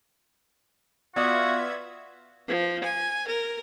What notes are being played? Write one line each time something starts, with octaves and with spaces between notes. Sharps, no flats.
B3 F4 F#4 D5 E5 F5 D#6 G#6
F3
G#5
A#4